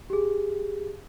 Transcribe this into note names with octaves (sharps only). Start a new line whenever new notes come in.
G4 G#4